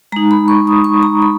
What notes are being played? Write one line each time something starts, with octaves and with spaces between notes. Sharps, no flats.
G#3 D#4 A#5
B5
C#6
D#6
C#6
A#5
B5